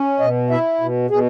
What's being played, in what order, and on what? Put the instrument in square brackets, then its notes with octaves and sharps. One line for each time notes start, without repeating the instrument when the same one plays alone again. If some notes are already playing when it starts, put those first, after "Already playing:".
Already playing: [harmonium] C#4
B2 D#5
E4 E5
B2
B2 G#4